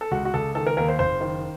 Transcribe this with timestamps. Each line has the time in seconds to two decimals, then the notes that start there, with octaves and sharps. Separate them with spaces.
0.01 A4
0.11 C#2 F#4
0.25 F#4
0.34 C#2 A4
0.55 D#3 A4
0.67 A#4
0.77 D#2 A#4
0.88 C5
0.99 F#1 C5
1.20 D#3